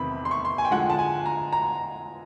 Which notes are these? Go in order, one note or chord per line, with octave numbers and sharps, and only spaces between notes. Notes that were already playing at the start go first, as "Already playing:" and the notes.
Already playing: E2 C3 D#3 B5
C6
C#6
C6
G#5
G5
D3 F3 G#3 F#5
A5
G#5
A#5
A#5